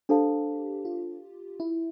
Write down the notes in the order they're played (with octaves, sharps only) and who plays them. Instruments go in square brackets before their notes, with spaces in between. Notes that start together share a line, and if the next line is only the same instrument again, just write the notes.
[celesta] D4 A4 C5 F5 A5 [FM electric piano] G4
[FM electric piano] F4
E4